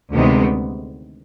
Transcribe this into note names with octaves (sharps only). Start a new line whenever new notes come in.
D2 C3 D#3 G#3 B3